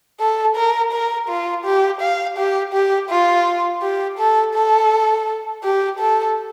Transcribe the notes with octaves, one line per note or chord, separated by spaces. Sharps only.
A4
A#4
A#4
F4
G4
F5
G4
G4
F4
G4
A4
A4
G4
A4